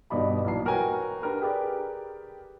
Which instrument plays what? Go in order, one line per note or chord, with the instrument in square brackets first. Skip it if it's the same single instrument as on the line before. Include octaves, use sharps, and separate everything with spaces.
[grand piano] G1 G2 B2 D#4 D5 B5
B1 A#2 E3 A5 C7
F#4 A#4 B4 C#5 G5 G#5
D4 G4 A#4 B4
G4 G#4 A#4 B4 D5